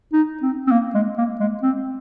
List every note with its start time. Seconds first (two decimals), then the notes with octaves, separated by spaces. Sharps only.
0.13 D#4
0.42 C4
0.67 C4
0.71 A#3
0.94 G#3
1.18 A#3
1.40 G#3
1.62 C4